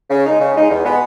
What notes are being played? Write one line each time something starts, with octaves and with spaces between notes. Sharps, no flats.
C#3
G#3 D#4
C#3
G#3 D#4
E2
B2 G#3 B3